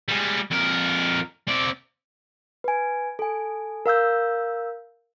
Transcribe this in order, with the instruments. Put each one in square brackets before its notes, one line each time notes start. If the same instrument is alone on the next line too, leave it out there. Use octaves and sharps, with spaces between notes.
[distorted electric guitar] G3 G#3
F2 A#4
C4 D5
[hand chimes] B4 G#5
A4 G#5
A#4 F5 E6 G6